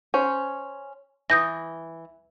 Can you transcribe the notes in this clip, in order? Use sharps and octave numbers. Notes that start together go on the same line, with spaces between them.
C#4 C5
E3 D#6 G6 A#6